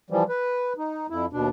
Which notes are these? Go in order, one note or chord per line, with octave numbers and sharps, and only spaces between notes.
E3 F3 G3
B4
D#4
F2 E4
D#2 B2 D4